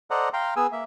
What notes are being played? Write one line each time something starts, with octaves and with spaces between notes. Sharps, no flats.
A4 C5 D5 D#5 F#5 A#5
F5 G5 A#5 C6
B3 G#4 G#5 E6
A#3 E5